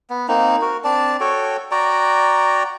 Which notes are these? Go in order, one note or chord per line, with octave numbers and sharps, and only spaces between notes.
B3
A#3 C4 D#4
F#4 A#4
C4 D4 D5 A5
F#4 A4 C#5 G5
F#4 D5 G5 A#5